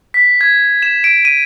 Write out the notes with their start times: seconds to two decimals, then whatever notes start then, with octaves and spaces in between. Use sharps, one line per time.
0.14 B6
0.41 G#6
0.82 E7
1.04 D7
1.25 D#7